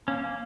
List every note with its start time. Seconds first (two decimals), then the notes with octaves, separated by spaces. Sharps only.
0.07 A#3 C#4
0.23 A#3